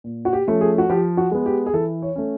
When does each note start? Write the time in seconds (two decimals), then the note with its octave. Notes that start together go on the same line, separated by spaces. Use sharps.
0.04 A#2
0.25 F#4
0.33 G4
0.47 F3 A3 C#4
0.61 G#4
0.78 F#4
0.89 F3 G4
1.17 F#4
1.31 G#3 B3
1.46 G4
1.66 G#4
1.74 E3 A4
2.02 C#5
2.16 A3 C#4